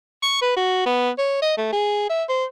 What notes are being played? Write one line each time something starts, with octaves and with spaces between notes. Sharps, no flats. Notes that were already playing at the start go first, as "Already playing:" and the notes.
C#6
B4
F#4
B3
C#5
D#5
A3
G#4
E5
C5